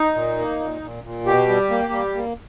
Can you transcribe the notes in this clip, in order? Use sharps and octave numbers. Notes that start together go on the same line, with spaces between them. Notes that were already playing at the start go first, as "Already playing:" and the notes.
Already playing: D#4
A#2
A#3
A#2
A#2
A#2
B2 G4
G3
A#3
G3
A#3